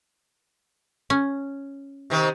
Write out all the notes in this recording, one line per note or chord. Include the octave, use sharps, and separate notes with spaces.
C#4
C3 D#3 C4